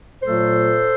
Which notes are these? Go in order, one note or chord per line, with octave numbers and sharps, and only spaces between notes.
A#2 F#3 A3 A4 C5